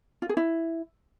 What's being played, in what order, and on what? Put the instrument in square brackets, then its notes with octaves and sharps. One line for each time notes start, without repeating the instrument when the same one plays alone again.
[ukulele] F4
G#4
E4